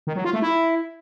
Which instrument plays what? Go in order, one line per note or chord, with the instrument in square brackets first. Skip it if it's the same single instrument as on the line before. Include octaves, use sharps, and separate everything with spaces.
[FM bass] D#3
F#3
F4
A3
E4